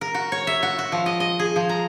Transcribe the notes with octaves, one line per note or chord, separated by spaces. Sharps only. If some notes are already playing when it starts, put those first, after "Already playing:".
A#4
F#4
C#5
E5
F#4
F#4
F3
D#5
D#5
G#4
F3
A#5